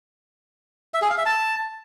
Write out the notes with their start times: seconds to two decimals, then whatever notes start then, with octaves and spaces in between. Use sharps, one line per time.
0.94 E5
1.02 G#4
1.10 F5
1.18 E5
1.26 A5